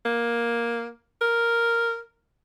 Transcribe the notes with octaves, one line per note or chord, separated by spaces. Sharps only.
A#3
A#4